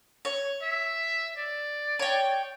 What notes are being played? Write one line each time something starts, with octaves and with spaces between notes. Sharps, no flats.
C#5
E5
D5
C#5 G5